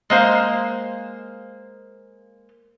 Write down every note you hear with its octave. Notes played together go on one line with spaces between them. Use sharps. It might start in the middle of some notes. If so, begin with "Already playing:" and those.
G#3 A#3 C5 F5